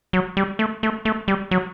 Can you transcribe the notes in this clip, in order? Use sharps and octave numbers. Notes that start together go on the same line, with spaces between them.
F#3
G3
A3
A3
A3
G3
F#3